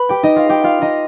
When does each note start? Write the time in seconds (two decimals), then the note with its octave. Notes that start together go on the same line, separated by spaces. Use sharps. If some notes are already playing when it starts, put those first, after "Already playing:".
Already playing: B4 B5
0.09 G4 G5
0.23 D#4 D#5
0.36 F4 F5
0.49 G4 G5
0.64 F4 F5
0.82 D#4 D#5